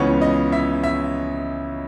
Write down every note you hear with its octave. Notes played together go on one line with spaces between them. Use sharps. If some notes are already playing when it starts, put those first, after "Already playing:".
Already playing: C#2 C#3 E3 B3 C#5
D#5
E5
E5